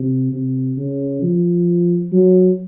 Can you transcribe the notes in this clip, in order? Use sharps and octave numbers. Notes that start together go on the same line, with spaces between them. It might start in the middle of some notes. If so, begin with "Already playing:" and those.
Already playing: C3
C3
C#3
F3
F#3